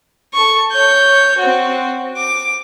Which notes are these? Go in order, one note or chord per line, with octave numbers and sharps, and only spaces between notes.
A4 C#6
C#5 G6
C4 F#4
D6